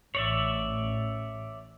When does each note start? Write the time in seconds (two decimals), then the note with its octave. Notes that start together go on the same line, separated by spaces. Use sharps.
0.15 A1 C#5 D5 E5